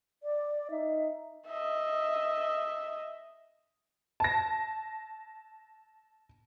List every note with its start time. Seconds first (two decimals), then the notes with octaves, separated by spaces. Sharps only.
0.23 D5
0.71 D#4 E5
1.48 D#5 E5
4.20 A5 A#6